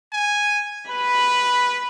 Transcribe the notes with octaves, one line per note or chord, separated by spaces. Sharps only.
G#5
B4 B5